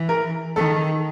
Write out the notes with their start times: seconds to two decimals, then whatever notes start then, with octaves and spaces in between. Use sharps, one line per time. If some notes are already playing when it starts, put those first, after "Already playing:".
Already playing: E3
0.09 A#4
0.56 D#3 A4